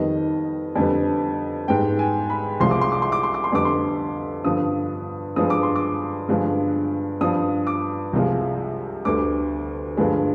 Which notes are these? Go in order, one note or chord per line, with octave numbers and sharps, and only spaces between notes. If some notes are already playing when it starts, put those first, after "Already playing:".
Already playing: F2 D#3 G3 B3 D#5
F2 D3 G3 B3
G#2 G3 B3 G5
G#5
B5
C2 C3 F3 G#3 C6
D6
C6
D6
C6
D6
C6
D6
C6
F2 D3 G3 B3 D6
C6
G2 D3 F3 B3 D#6
G2 F3 G#3 B3 D#6
D6
C6
D6
G2 D3 F3 G#3 B3
G2 F3 B3 D#6
D6
C2 C3 F3 G#3
D2 D3 G3 B3 D6
G2 D3 F3 G#3 B3